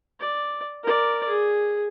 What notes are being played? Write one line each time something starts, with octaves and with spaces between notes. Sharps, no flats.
D5
A#4 D5
G#4